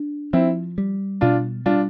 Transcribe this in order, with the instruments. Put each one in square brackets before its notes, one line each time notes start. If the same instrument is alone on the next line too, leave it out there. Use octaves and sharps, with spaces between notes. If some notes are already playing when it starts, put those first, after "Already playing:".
Already playing: [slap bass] D4
[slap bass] F3 [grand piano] C4 E4
[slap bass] G3
[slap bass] B2 [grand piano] D4 F4
[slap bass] G3 [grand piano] D4 F4